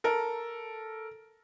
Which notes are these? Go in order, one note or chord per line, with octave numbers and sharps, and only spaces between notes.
A4 A#4